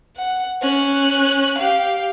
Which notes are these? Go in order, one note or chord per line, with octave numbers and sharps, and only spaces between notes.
F#5
C#4 F#6
G4 F5